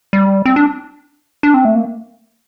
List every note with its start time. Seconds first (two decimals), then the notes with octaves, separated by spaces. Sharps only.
0.13 G3
0.46 C4
0.56 D4
1.43 D4
1.54 C4
1.65 A3
1.75 A#3